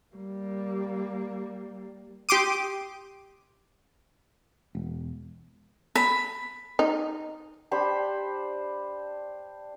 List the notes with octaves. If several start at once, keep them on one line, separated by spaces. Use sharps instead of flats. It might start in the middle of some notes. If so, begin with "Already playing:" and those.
G3 A#3
G4 C6 D6 D#6
E1
B5
D#4
D4 G4 C5 B5